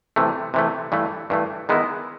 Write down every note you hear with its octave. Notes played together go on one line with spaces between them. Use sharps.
C3 E3 A3
C3 E3 A3
G2 E3 A3
G2 E3 A3
D#3 G#3 B3 E4